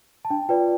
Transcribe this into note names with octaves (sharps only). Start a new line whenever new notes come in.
A5
D4 G5
F4 B4 D5 G5